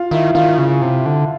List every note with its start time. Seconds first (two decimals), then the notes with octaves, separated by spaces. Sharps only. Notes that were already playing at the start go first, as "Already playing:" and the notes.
Already playing: F4 F5
0.11 D#3 E4 E5
0.35 D#3 F4 F5
0.58 C#3
0.82 C3
1.06 D3